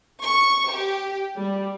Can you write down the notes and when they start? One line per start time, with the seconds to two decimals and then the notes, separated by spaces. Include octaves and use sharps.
0.24 C#6
0.70 G4
1.39 G3